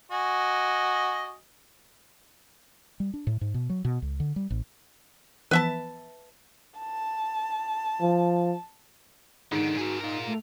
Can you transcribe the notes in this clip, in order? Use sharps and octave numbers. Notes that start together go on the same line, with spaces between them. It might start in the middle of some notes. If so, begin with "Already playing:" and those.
F#4 D#5 G#5
G3
D4
A2
G#2
B2
F#3
B2
C#2
D3
G3
A1
E3 F3 B3 B4 E5 A5
A5
F3
G#2 D3 D#3
F#4 G#4 A#4
D#4 F4 A#4
A3